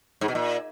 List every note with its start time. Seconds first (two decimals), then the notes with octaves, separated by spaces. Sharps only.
0.21 G#2
0.28 B2
0.35 A#2